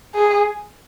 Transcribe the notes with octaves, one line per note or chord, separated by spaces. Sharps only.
G#4